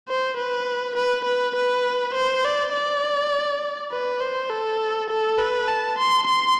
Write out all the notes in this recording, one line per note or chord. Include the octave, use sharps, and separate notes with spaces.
C5
B4
B4
B4
B4
C5
D5
D5
B4
C5
A4
A4
B4
A5
C6
C6